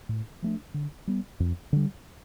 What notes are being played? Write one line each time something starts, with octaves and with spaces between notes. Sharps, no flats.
A2
F3 A3 D4
D3
G3 B3
F2
D3 G3